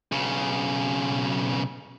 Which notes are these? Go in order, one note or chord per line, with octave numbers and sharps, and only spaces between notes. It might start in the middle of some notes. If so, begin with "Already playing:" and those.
B1 C#3